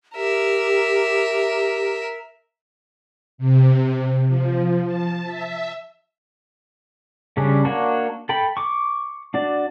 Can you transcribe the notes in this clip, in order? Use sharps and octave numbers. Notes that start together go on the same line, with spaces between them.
G4 A#4 E5
C3
F3
A5
E5
C#3 G3 C#4 D4
A#3 D4 F#4 C#5
A4 G5 B5
C#6 D6
D4 F#4 D5